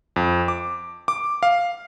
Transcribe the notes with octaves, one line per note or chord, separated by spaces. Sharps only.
F2
D6
D6
F5